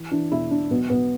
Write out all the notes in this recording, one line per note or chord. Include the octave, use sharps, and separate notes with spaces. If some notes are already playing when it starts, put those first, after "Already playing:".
Already playing: E3
E3 D4
E1 E4
E1 D4
B1 B3
B1 B3